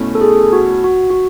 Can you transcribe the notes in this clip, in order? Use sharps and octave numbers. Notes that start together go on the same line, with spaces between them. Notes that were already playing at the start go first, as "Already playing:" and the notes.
Already playing: B2 A3 C#4 E4
A4
G#4
F#4
F#4
F#4